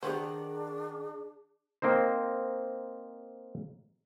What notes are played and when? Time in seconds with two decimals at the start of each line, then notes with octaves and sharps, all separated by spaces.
0.03 D#3 D4 G4 G#4 B4 C5 F#5 A#5
1.82 A#3 C4 D#4 C5